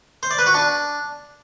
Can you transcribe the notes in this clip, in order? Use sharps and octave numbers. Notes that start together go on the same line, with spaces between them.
C5
D5
B4
F#4
D4